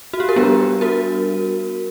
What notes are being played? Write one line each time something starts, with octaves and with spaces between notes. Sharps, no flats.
F#4
G4
A#4
G3 B3 D4 G4 B4
F#4 A#4